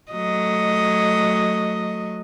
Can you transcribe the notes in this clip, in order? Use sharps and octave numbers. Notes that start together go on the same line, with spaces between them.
F#3 A3 D#5